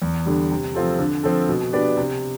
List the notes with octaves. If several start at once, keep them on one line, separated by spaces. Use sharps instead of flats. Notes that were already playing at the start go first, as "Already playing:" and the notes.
E2
D3 G3
C3
F3 C4 F4 A4
D3
F3 C4 F4 A4
B2
B3 D4 G4 D5
C3